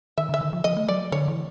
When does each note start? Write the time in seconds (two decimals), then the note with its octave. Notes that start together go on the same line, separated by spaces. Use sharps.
0.18 D#3 E5
0.29 D3 E5
0.41 D#3
0.53 F3
0.64 F3 D#5
0.77 A3
0.88 F#3 D5
1.12 D3 C#5
1.28 E3